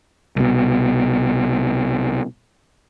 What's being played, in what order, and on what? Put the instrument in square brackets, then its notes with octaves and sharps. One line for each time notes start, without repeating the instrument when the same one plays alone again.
[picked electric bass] C2 B2